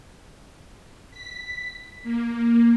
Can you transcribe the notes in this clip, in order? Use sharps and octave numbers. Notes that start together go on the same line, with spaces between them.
B6
A#3